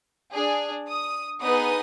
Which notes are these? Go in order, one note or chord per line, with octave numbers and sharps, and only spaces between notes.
D4 G#4
D#6
B3 D#4 G#4 D#6